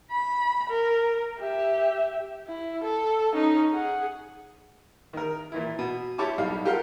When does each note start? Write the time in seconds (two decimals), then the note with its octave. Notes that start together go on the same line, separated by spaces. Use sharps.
0.11 B5
0.70 A#4
1.39 G4 E5
2.47 E4
2.84 A4
3.33 C#4 D#4
3.73 G#4 F#5
5.13 D#3 A#4
5.52 A#2 E3 E4
5.79 B2
6.18 E4 G4 C#5 A5 D6
6.38 B1 G3 D#4 F5
6.65 F4 G4 A4 A#4 F5 F#5